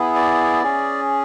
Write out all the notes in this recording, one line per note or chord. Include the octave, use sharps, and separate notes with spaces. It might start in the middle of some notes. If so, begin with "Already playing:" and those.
Already playing: B3 E4 G#4
D5
C#4 G#4